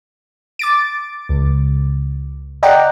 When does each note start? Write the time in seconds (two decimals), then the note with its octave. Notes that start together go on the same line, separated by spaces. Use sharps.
0.59 D6 A6 D7
1.29 C#2
2.63 D5 D#5 F#5 G5 A#5